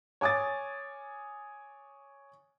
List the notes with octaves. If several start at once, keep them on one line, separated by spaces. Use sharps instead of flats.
C#5 G#5 D6 D#6 A6